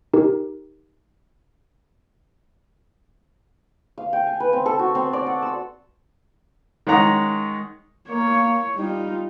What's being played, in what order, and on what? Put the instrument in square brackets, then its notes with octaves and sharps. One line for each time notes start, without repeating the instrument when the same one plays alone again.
[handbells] D#4 G4 A#4
[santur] F5
G5
G#5
B4
C4
A4
F#4
C4
D5
F#5
E6
[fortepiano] D#3 G#3 C#4 F#5 A#5 D#6
[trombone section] A#3 [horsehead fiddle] C#5
[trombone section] G3 [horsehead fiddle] D#4 F4